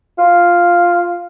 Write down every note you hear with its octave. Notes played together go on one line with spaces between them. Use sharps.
F4